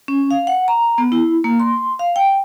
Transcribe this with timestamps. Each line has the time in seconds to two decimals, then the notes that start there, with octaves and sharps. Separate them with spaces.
0.08 C#4
0.31 F5
0.47 F#5
0.68 A#5
0.98 B3
1.12 E4
1.44 A#3
1.60 C6
1.99 F5
2.16 G5